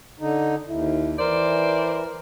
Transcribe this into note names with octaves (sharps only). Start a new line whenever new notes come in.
D3 D#4
D#2 E4
E3 A#4 C5 D5